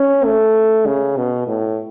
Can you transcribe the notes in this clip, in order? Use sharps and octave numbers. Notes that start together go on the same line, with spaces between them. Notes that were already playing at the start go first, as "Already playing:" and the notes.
Already playing: C#4
A3
C#3
B2
A2